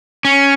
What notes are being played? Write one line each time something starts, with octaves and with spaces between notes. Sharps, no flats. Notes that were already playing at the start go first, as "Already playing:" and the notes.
C#4